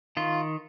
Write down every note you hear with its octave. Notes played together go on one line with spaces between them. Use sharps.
D#3 F4